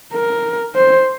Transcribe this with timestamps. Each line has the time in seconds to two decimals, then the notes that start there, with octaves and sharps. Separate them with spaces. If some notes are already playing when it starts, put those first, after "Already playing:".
0.13 A#4
0.75 C5